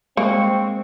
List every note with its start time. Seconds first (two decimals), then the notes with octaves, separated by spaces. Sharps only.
0.17 G#3 A#3 C4 C#6